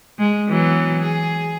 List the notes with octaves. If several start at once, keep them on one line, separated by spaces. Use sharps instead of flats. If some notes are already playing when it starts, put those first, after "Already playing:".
G#3
E3 F#3 B3
G#4